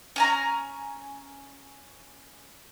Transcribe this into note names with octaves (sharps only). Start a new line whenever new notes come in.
C#4 G#5 A#5